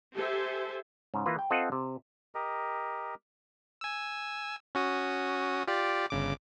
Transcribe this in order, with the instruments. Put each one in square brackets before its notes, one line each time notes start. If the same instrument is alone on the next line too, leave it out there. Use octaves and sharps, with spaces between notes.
[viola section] G4 A4 C5 E5 G#5
[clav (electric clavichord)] G#2 C#3
E3 A#3 F4 B4
G5
C4 F4 A4 D#5 F#5
C3
[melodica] G4 A#4 D#5
[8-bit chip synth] G#5 E6
C#4 F#4 D#6
F4 G4 D5
G1 C#3 D6